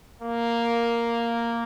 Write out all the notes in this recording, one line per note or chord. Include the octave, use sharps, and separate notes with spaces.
A#3